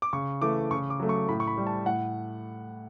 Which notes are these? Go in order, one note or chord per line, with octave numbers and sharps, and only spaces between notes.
D6
C#3 C#6
E3 A3 D6
C#3 C#6
D6
F#3 A3
C#6
A2 B5
C#6
B5
G3
A5
A2 F#5